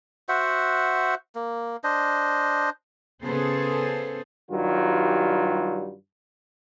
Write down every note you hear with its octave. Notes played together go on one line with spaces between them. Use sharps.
F#4 C5 E5 F#5
A#3
D4 C5 D#5
C#3 B3 G#4 A4 C5
G2 D#3 F#3 G3 F4